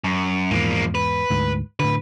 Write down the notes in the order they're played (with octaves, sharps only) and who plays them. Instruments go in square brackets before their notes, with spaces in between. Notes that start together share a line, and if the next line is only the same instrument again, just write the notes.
[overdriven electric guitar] F#2
[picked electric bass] E2 G#2 [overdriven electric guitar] F3 A#3
[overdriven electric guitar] B4
[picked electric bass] D2 G#2
[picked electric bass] A2 D3 [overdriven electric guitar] B4